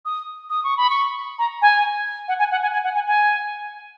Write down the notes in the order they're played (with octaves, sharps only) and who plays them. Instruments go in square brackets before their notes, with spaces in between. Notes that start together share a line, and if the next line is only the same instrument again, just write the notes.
[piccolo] D#6
D#6
C#6
B5
C#6
A#5
G#5
F#5
G#5
F#5
G#5
G#5
F#5
G#5
G#5